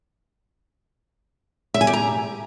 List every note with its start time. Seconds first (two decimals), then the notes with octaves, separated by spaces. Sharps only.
1.74 E5
1.81 G#5
1.87 G4
1.93 A#5